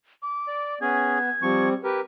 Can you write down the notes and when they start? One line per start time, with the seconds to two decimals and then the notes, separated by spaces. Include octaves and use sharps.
0.22 D6
0.47 D5
0.81 B3 C#4 G#4 G#6
1.42 F3 G3 C4 C#6
1.84 G4 A#4 B4